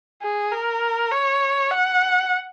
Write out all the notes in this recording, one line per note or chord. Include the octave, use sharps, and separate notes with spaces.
G#4
A#4
C#5
F#5